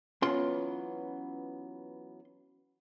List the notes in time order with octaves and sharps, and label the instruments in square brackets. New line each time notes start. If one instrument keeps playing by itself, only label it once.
[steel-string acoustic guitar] E3 F#3 B3 [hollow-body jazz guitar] C#4 F4 C6